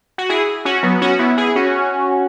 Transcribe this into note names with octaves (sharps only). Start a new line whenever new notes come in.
F#4
E4 G#4
C#4 F#4
F#3 B3
C#4 F#4
B3 E4
E4 G#4
C#4 F#4